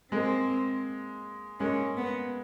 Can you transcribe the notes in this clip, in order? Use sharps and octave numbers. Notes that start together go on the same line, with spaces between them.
G#3 A#3 C4
G#3 A#3 C#4
B3